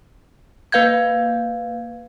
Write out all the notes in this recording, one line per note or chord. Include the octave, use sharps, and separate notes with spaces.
A#3 B4 F5 G6 G#6